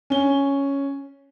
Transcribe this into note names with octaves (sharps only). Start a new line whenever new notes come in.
C#4 G7